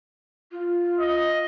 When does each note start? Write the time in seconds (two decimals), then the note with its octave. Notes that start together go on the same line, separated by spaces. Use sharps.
0.52 F4
0.99 D#5